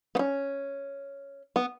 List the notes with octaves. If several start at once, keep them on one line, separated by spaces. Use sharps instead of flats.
B3
C#4
B3